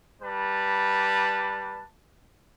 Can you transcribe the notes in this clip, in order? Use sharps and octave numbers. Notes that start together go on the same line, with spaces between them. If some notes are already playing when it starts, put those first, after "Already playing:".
G3 B4 A5